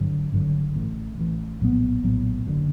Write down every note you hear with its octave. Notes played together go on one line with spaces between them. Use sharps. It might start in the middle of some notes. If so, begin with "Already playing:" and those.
Already playing: G#1 G2 D3 F#3
G#1 G2 D3 F#3
A1 A2 E3
A1 A2 E3
A#1 A2 F#3 B3
A#1 A2 F#3 B3
F#1 F#2 D3